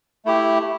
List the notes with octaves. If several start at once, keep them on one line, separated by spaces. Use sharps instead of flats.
A3 E4 G4